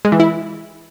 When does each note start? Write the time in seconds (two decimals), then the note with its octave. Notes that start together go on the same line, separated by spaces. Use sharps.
0.05 G#3
0.12 E3
0.20 E4